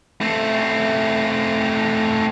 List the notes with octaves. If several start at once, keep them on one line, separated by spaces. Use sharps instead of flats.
A3 C4